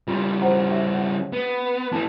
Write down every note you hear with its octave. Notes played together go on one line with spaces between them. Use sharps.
C#3 G3 F4 B5 C6
C5 F#5 A#5
C#4 G4 E5
F#5
B3
E3 A3 A4 A5